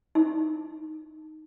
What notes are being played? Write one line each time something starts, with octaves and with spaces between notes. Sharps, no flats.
D#4